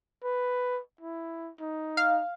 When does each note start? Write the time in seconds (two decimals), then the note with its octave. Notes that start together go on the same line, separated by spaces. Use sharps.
0.24 B4
1.01 E4
1.60 D#4
1.97 F5